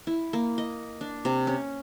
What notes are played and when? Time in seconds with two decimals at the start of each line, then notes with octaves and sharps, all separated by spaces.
0.07 E4
0.33 A#3
0.58 D#5
1.01 D4
1.25 C3
1.47 C#4